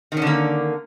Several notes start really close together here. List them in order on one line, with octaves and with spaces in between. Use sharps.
D#3 C#4 D3 A#3